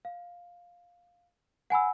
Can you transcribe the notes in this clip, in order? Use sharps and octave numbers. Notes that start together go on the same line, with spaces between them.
F5
F#5 G#5 B5 E6